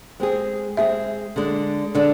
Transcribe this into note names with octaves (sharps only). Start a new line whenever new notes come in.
G#3 C4 G#4
G#3 C4 G#4 E5
D3 G#3 D4
D3 G#3 D4 D5